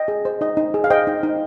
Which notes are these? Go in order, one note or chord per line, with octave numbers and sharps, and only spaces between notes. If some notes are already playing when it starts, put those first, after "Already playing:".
Already playing: D#5 G5
G#4
C5
D#4 D#5
D#4
G#4
F5
C5 D#5 G5
D#4
D#4